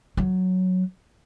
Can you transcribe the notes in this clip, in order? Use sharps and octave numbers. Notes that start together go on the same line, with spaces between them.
F#3